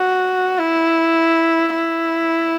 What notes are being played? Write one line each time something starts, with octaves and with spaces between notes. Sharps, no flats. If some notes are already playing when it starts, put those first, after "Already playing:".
Already playing: F#4
E4
E4